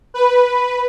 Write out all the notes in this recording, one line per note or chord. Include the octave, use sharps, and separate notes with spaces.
B4